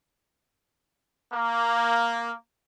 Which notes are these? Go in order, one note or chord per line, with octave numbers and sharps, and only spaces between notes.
A#3